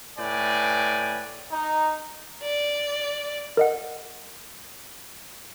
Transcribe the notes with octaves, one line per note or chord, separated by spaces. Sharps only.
A2 B4 D5 G5 G#5
D#4
D5
A#4 D#5 F#5